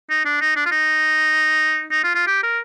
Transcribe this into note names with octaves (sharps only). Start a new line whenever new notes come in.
D#4
D4
D#4
D4
F4
D#4
D#4
F4
F4
G4
A#4